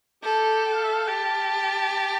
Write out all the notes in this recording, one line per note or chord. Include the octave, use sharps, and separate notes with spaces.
G4 A4
G5
F5
E5
F5
G4 A5